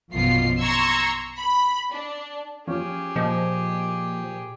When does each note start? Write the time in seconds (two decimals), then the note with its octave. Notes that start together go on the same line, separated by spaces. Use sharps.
0.11 A#1 F#2 B2 F3 F4 C7
0.59 A#5 C6 C#6 E6 G#6
1.37 B5
1.92 D4
2.67 F3 C#4 G4 G#4
3.16 A#2 F3 D#5